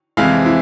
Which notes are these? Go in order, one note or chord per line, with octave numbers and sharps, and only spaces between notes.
F2 C3 E3 G#3 E4 F5
E4